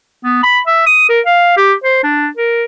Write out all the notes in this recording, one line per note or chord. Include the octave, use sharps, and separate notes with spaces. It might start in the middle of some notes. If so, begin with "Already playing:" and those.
B3
B5
E5
D#6
A#4
F5
G4
C5
D4
A#4